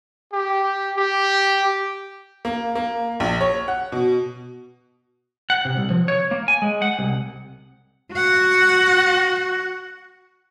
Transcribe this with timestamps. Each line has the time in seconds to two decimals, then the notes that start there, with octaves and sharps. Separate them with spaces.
0.33 G4
0.97 G4
2.45 A#3
2.75 A#3
3.20 A#1
3.41 C#5
3.68 F#5
3.92 B2
5.50 F#5
5.65 C3
5.77 C2
5.90 F3
6.08 C#5
6.31 A#3
6.48 G#5
6.62 G#3
6.82 F#5
6.99 C2
8.14 F#4 F#5